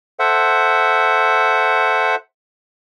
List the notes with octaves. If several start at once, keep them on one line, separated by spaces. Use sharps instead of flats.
A4 C5 E5 F#5